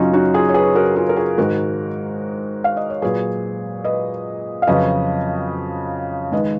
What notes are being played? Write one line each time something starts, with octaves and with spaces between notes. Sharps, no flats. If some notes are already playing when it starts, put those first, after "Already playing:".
Already playing: F#2 C#3 F#3 C#4 D#4 F4
D#4 F#4
F4 G#4
C#5
G#4 B4
F#4 A#4
F4 G#4
A#4
F4 G#4
G#2 D#3 G#3 F#4 A#4
F5
D#5
C#5
A#2 F#3 G#4 B4
B4 D#5
F5
F2 C#3 F#3 B4 D#5
D#3 G#3 B4 D#5